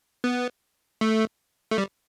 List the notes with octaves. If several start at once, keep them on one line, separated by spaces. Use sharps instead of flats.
B3
A3
A3
G3